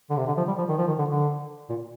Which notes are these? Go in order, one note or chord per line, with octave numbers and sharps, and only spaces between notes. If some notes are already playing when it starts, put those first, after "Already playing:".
D3
C3
D3
F3
G3
F3
D#3
F3
D#3
D3
D3
A#2